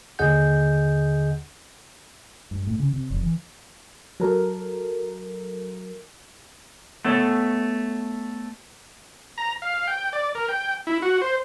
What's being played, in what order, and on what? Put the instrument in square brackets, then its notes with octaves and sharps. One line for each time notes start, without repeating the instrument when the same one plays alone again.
[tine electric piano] D#2 D3 G#4 D#5 F#5 G6
[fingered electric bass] G2
A2
C#3
C3
F1
E3
[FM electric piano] F#3 A4 A#4
[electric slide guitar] A3 B3 A4 C#5
[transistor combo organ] A#5
F5
G5
D5
A#4
G5
E4
F#4
C5